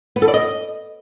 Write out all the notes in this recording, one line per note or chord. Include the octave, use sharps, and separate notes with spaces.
B3
A4
D5
D#5